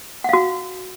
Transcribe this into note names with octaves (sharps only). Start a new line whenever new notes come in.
F#4 F5 F#5